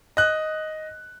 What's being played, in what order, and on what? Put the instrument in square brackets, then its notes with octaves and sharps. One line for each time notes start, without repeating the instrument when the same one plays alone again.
[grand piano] D#5 F#6